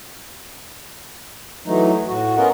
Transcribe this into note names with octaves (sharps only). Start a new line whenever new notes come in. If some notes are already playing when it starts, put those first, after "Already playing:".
E3 F#3 A3 D#4
A2 F#4
B3 C#4 F4 A#4 D#5 F#5